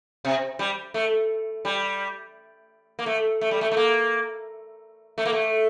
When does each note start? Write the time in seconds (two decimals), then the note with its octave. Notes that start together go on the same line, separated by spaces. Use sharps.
0.25 C3
0.59 G3
0.94 A3
1.65 G3
2.99 A#3
3.06 A3
3.41 A3
3.51 G3
3.61 A3
3.71 A3
3.77 A#3
5.18 A3
5.26 A#3
5.33 A3